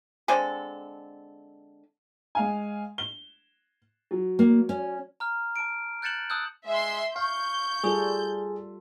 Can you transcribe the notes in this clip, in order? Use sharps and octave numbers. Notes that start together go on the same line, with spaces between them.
D3 G#3 C4 A4
G#3 F5 G#5
G7
F#3
A#3
C#4
A#5 F6
A5 D7
F#6 G6 A6 C#7 E7 F#7
A5 D#6 E6 F#6 G6
G#3 E5 C6
F5 C#6 G6
G3 F4 G#4 A4